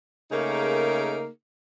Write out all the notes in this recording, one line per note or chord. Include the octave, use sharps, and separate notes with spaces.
C#3 A3 A#3 D#4 G#4 A#4